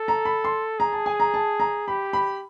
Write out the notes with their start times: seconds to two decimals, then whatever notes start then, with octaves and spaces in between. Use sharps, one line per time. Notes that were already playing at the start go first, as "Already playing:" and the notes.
Already playing: A4
0.08 A#5
0.25 B5
0.44 C6
0.79 G#4 A#5
0.93 A5
1.06 G#5
1.20 A#5
1.34 A5
1.60 A#5
1.88 G4 B5
2.13 B5